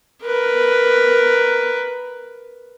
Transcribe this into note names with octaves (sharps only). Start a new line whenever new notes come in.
A#4 B4